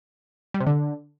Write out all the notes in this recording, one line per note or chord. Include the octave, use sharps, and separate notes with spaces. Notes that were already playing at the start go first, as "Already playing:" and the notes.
G3
C3
D3